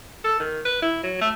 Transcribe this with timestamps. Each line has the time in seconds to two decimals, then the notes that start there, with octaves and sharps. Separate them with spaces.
0.24 A4
0.39 D#3
0.65 B4
0.82 E4
1.03 F#3
1.21 A3